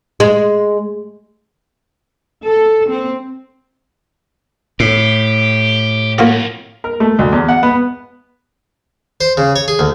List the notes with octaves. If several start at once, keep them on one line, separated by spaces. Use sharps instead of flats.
G#3
A4
C4
A2 G4
F2 A#3 F4 F#4
A#4
A3
D2
E2
F#5
B3
C5
C#3
C#5
G#4
D2